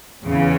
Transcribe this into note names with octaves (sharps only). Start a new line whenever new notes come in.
E2 C#3 E3